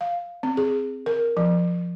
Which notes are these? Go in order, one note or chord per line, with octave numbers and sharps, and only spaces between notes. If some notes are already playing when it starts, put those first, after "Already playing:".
F5
C4
G#4
A#4
F3